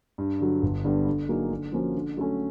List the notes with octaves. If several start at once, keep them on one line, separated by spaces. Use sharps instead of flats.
G2
D3 F#3
G1
G2 D3 G3 B3
D3
F#3 A#3 D#4 G#4
D3
F3 A#3 C#4 F#4
D3
F#3 A3 C#4